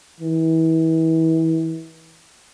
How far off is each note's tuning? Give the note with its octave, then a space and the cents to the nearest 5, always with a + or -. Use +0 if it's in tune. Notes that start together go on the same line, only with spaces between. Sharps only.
E3 -30